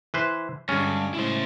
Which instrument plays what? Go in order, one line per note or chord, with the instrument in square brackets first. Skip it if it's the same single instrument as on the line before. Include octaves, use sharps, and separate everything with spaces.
[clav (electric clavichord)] E3 B4 C5
[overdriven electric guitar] G2 [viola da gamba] D3 F#3 G#3 [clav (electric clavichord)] C#4
[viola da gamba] A2 C#3 G#3 [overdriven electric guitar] E4 C5